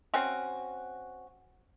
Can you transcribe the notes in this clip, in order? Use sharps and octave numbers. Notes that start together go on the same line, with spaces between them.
C4 C#4 F#4